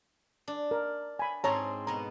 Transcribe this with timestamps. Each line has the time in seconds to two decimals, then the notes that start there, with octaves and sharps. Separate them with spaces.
0.48 D4
0.71 A#4
1.19 G#5 B5
1.44 G#2 C4 G#4 C#5 A5 A#5
1.87 B2 B3 A#5